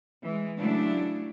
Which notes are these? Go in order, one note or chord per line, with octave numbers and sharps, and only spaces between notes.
E3 G#3
C#3 F#3 A3 D4 E4